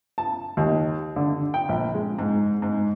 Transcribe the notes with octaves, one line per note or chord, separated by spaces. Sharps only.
A5
D#2
D3
G5
A#1
G#3
G#2
G#2